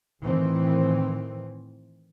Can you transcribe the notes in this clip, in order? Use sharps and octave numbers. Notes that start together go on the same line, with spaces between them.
A2 D#3 E3 C4